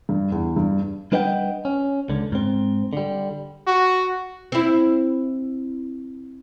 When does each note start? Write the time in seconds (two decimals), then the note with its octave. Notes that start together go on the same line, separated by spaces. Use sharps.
0.09 G2
0.32 E2
0.56 G2
1.12 G3 D4 B4 D#5 F#5 G5
1.65 C#4
2.09 C#2 D3
2.32 G#2 C4
2.93 D3 G3
3.67 F#4
4.52 C4 E4